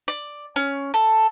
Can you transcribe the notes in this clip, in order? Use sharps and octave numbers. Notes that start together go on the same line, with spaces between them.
D5
C#4
A4